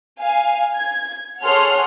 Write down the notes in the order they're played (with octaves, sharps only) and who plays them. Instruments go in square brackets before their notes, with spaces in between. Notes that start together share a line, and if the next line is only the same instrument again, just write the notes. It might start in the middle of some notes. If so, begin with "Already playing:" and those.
[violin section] F5 G#5
G#6
G#4 A4 C#5 F#5 C6 F6